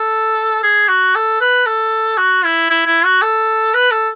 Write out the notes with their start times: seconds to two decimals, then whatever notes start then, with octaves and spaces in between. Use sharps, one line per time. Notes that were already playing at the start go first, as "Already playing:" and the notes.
Already playing: A4
0.63 G#4
0.88 F#4
1.15 A4
1.40 B4
1.66 A4
2.18 F#4
2.44 E4
2.70 E4
2.86 E4
3.04 F#4
3.22 A4
3.74 B4
3.91 A4